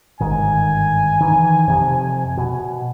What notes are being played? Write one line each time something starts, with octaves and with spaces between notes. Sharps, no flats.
G1 G#2 D#3 G#5
D#3 E3
F2 C3 F3
B2